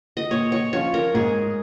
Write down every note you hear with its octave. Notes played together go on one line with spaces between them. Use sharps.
D#5
A#2 C#5
C#5
F3 C#4 F4 C#5
A#4
G#2 G#4